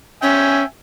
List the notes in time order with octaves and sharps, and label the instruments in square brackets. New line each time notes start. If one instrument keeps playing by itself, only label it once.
[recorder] C#4 [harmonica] E5 G5 G#5